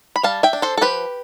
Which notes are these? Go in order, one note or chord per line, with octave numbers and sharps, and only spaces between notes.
B5
G3 F5 A5
E5 G5
D4
A4 C5
A4
F3 G4 B4